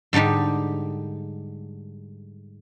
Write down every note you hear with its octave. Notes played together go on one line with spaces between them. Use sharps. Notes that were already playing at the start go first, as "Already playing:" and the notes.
G#2 D3 G3 D#4 G4